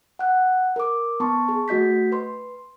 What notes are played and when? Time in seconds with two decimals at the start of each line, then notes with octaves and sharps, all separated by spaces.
0.19 F#5 F#6
0.76 A#4 D6
1.20 B3 A5 C6 C#6
1.49 G#4
1.68 A3 F#4 D#5 G6 B6
2.12 B4 C6